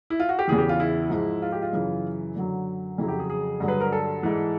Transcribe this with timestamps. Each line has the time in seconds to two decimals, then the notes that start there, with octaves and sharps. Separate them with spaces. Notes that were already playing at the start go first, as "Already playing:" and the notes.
0.10 E4
0.20 F4
0.29 F#4
0.39 G4
0.48 E2 C#3 E3 G#4
0.58 G4
0.69 F4
0.80 E4
1.10 G#2 F3
1.42 F4
1.52 G4
1.62 F4
1.73 F#2 C#3 E3
2.36 F#2 D3 F#3
2.98 F2 C#3 F#3 E4
3.08 G4
3.19 G#4
3.30 G#4
3.60 G2 D3 F#3
3.68 B4
3.81 A#4
3.92 A4
4.23 G#2 E3